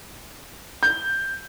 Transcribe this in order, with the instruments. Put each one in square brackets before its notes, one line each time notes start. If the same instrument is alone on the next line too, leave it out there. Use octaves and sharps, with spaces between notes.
[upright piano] G6